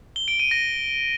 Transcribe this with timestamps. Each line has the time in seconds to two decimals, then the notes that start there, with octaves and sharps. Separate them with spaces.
0.16 G7
0.28 D7
0.40 D#7
0.51 A#6